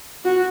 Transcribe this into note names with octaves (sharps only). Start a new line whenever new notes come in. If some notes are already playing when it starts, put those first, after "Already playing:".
F#4